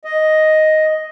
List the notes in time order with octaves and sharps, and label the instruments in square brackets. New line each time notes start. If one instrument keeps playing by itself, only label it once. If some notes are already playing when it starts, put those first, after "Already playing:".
[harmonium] D#5